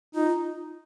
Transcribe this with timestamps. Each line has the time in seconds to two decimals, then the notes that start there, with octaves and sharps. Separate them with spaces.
0.15 D#4 F4